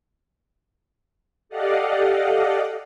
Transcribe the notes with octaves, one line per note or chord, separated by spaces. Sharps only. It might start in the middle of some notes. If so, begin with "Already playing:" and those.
G4 A4 D5 D#5 F5 F#5